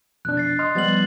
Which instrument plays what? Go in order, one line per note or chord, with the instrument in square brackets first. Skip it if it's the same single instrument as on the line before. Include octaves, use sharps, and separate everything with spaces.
[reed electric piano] F2 B2 D4 [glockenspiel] F#6
[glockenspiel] A6 C7
[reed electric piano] D#5 C6 F6
[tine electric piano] F3 G3 B3 [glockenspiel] A6 F#7